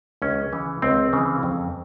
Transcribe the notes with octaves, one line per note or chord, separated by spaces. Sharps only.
C#2 C#4
C#3 E3
C#2 C4
C#3 E3
F2